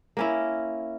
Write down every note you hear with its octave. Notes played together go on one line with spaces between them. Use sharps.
A#3 C#4 E4